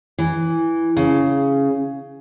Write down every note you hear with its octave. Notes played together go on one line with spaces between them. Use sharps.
E3
C#3